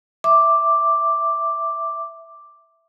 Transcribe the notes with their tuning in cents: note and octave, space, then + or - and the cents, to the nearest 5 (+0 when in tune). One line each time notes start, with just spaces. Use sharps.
E5 +0 D6 +0